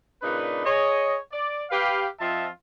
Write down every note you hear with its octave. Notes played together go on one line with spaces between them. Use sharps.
A#2 C#3 D4 D#4 B4
G#4 C#5 D#5
D5
G4 B4 F5
F3 C4 F4 D#5 E5 A5